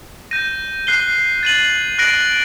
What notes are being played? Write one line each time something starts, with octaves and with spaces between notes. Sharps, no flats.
G6 A#6 D#7
F#6 C7 G7
A6 D#7 F#7
F#6 A#6 D7 F#7